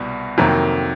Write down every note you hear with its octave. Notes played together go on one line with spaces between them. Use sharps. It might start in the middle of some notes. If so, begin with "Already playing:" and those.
Already playing: C2 B2 G3
F2 C3 D#3 F#3 A#3